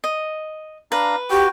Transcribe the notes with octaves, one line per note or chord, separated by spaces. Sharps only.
D#5
D4 B4 F5 A#5
F#4 G4 G5